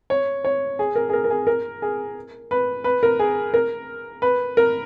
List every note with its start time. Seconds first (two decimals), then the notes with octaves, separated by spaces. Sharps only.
0.10 C#5
0.45 C#5
0.79 G#4
0.95 A#4
1.09 G#4
1.13 A#4
1.24 A#4
1.30 G#4
1.47 A#4
1.82 G#4
2.51 B4
2.84 B4
3.03 A#4
3.19 G#4
3.54 A#4
4.22 B4
4.57 A#4